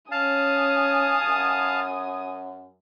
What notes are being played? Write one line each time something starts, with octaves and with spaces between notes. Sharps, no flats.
C#4 F5 G#5 A5 D#6
F#2